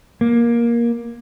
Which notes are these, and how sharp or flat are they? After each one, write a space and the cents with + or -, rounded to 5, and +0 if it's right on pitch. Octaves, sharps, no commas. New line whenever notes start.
A#3 +15